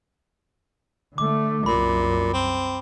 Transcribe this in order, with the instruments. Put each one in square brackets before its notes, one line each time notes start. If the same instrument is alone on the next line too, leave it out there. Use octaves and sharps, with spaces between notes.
[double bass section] D3 A3 [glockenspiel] D6
[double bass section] C2 F#2 [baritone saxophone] A#2 [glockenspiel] B5
[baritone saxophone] C4